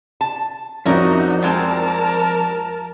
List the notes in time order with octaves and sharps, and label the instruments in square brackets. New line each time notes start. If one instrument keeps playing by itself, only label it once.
[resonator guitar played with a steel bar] A5
[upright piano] F2 D5 [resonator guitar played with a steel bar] C#4 E4 A#4 [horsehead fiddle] D#4 F#4
[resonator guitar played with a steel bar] G3 G#3 C4 [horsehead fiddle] A#4 A5